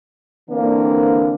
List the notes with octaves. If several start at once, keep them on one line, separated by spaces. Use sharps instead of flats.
D3 E3 A#3 C4 D4